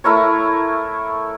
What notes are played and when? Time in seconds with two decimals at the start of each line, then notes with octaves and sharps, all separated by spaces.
0.04 A3 E4 A#4 C#5